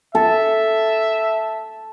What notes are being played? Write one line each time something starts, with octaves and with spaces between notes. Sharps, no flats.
A4 E5